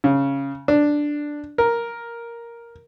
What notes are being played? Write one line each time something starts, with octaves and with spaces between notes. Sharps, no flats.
C#3
D4
A#4